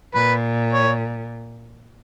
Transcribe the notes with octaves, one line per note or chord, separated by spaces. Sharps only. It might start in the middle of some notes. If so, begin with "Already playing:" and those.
A#2 B4
C#5